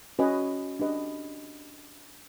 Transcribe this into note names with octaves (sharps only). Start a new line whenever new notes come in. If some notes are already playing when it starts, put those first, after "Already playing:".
C#4 F#4 B4 D#5 G#5
D4 G4 B4 D#5